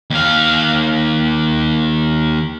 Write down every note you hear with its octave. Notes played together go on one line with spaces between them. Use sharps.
D#2 F5